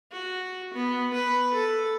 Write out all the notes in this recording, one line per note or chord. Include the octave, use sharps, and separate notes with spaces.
F#4
B3
B4
A4